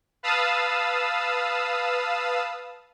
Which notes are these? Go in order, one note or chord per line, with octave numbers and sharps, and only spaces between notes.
B4 F5 A5 D#6 E6